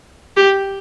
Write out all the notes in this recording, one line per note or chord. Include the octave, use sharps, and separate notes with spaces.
G4